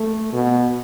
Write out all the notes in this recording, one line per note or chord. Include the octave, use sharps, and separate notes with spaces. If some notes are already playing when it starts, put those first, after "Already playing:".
Already playing: A3
B2